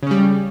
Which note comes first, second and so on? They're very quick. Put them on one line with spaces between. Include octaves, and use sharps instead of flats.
C#3 C#4 G3